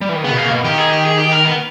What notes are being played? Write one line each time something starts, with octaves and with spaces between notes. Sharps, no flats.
G3
E3
D#3
C#3 B3
B2
C#3 A#3
B2
D#3 G4
G#4
G4
G#4
G4
A#4
B3